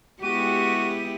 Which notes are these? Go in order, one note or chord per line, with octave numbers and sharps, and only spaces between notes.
G#3 B3 E4 F#4 G4 D#7